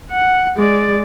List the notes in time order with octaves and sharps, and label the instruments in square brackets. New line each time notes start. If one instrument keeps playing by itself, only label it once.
[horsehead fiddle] F#5
G#3 D5